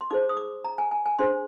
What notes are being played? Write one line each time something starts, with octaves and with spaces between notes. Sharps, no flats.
C6
D#4 G#4 C5 D6
D#6
D6
A#5
G#5
G#5
G#5
D4 G#4 C5 C6